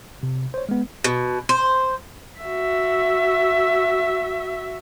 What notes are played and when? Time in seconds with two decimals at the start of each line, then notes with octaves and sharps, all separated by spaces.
0.23 C3
0.54 C5 C#5
0.69 G#3 B3
1.04 B2
1.49 C5
2.41 F#4 E5